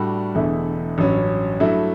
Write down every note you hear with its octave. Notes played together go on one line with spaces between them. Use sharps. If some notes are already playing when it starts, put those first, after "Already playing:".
Already playing: A2 G3 D4 F#4 A4
E1 E2 D3 A3 E4
A1 G2 F#3 C#4
G2 F#3 A3 E4